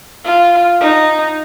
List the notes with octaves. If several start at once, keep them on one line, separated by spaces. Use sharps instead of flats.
F4
D#4